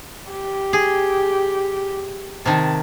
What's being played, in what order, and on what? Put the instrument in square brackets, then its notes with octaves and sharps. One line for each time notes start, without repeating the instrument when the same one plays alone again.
[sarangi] G4
[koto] G#4
[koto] C3 D#3 [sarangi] A5